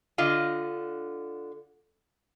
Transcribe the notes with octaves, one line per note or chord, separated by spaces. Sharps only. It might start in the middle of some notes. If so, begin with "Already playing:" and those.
D3 F4 D#5